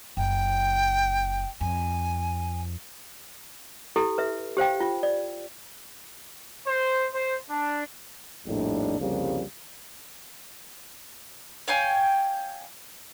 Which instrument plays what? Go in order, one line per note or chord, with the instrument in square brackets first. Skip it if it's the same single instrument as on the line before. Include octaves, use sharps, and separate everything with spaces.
[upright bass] F#1 [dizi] G5
[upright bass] F2 [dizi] G#5
[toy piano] E4 G4 A4
B4 E5
G4 C5 F5 G5
F4
D5
[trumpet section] C5
C5
D4
[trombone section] A#1 F2 A2 G3 D4 D#4
C2 F2 C#3 F3 G3 A#3
[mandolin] C#5 F5 G5 G#5